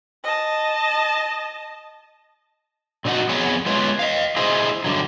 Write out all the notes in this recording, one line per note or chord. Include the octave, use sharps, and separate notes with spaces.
D#5 A5
A#2 C4 D#4 F#4 F#5
F2 B3 G#4 C#5 F#5
G#3 F4 B4 C#5
D#5 F5
E4 G#4 C5 D#5
G2 D3 F#3